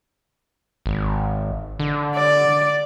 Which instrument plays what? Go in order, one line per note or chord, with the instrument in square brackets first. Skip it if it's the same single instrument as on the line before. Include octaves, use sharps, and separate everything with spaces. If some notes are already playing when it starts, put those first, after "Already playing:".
[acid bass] G#1
D3
[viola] D5